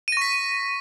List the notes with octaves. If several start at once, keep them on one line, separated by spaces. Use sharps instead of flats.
C#6 A#6 B6 D#7